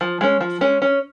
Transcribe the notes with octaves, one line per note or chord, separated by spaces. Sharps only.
F3
G#3 C#4
F3
G#3 C#4
C#4